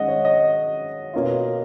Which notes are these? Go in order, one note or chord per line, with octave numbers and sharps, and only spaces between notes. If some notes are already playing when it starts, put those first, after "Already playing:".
Already playing: F#2 D#3 G#3 C#4 D#5 F#5
C#5
D#5
B2 A#3 C#4 F4